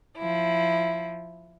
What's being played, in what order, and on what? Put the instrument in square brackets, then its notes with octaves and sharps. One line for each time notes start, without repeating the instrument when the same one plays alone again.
[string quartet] F3 E4